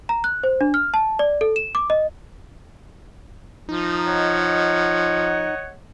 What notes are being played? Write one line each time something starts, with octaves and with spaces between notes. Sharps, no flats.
A#5
F#6
C5
D4
F6
A5
D5
A4
E7
D6
D#5
F3 D#4
C#5 D#5 F#5